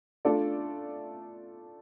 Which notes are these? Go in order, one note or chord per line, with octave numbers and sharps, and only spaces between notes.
A3 D4 F4 A4 D5